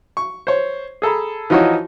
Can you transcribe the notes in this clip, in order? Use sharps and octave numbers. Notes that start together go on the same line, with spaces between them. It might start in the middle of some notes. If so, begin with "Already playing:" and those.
C#6
C5 C#5
G#4 A4 A#5 B5
E3 F3 D#4 F#4 C#5